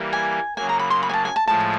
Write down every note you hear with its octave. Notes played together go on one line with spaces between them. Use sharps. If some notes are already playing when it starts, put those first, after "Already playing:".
Already playing: E3 G3 A#3
G#5
C#3 F#3 A#3 G#5
A#5
B5
C6
B5
G#5
A5
G#5
A5
A2 F3 G#3 A5